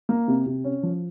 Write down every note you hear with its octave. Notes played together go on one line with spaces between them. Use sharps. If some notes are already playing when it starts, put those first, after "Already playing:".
A#3
C3
C3
C#4
F3